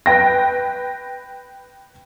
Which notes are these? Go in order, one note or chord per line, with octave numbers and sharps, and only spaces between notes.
B4 G5 A#6